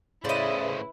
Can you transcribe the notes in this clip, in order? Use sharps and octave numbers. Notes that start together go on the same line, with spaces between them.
A2 C#3 E4 B4 C5 D5 D#5